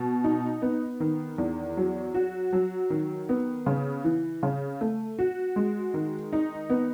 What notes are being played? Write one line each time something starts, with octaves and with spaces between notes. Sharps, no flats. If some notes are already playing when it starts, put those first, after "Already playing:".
Already playing: B2
D#4
B3
D#3
E2
F#3
F#4
F#3
D#3
B3
C#3
E3
C#3
A3
F#4
G#3
D#3
D#4
B3